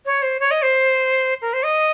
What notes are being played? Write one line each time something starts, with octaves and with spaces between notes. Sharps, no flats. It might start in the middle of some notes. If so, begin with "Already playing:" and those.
C#5
C5
C#5
D#5
C5
A#4
C5
D#5